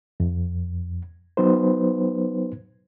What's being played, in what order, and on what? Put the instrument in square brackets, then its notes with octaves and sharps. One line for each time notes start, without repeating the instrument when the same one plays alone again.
[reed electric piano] F2
F#3 B3 D#4 B4 C5